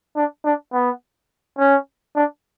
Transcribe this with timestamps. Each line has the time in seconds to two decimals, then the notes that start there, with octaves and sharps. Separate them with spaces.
0.16 D4
0.45 D4
0.73 B3
1.59 C#4
2.16 D4